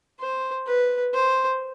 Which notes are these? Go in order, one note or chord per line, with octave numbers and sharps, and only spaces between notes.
C5
B4
C5